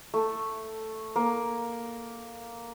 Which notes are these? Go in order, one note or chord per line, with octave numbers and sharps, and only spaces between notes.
A3
A#3